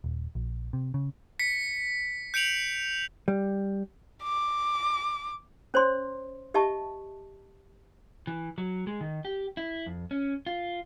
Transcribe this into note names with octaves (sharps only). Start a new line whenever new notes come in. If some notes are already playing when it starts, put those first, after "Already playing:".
D#1
A#1
C3
C#3
B6 C#7
G6 C#7 D7 F7 F#7
G3
D6
C#4 C5 C#5 C6
G4 D#5 E5 A5 C#6
E3
F#3
G#3
D#3
G4
E4
F2
C#4
F4